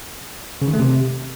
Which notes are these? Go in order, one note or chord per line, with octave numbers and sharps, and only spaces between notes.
C#3
D#3
A3
C3